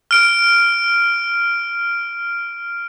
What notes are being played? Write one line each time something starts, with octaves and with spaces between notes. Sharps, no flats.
F6 D7